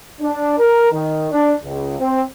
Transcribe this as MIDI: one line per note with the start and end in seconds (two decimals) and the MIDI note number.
0.21 0.56 62
0.59 0.89 70
0.92 1.27 51
1.31 1.53 62
1.64 1.99 37
2.00 2.22 60